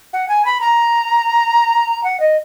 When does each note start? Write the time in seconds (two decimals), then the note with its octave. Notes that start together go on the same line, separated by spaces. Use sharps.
0.13 F#5
0.28 G#5
0.45 B5
0.61 A#5
2.04 F#5
2.20 D#5